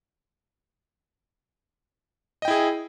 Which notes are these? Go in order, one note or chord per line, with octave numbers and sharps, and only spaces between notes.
E4 G#4 D#5 G5